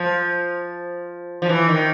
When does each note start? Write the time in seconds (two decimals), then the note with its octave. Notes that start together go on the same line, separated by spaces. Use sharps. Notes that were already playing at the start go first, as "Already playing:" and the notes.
Already playing: F3
1.42 F3
1.49 E3
1.69 D#3